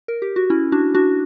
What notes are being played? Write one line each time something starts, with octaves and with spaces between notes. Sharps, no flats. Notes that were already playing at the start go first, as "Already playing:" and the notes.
A#4
G4
F#4
C#4 E4
D4 F#4
D4 F#4